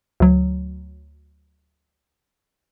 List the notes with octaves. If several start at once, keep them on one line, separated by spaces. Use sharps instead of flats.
D2 F#3